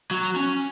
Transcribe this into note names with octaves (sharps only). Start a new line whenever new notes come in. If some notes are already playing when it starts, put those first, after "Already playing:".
F#3
C#4